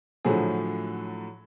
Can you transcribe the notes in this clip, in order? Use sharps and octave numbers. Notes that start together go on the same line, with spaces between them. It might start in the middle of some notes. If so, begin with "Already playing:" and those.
A2 D3 F3 F#3 G#4